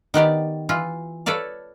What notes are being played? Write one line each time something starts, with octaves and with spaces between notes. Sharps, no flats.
D#3 B3 G4 D5
E3 F4
A4 B4 C#5 D5 F5